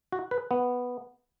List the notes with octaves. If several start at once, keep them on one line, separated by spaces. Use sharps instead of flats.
F#4
B4
B3